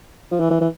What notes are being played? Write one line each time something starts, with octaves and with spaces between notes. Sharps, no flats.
F3
E3
E3
E3